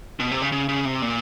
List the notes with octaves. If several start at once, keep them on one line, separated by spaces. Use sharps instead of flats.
B2
C3
C#3
C#3
C#3
C3
A#2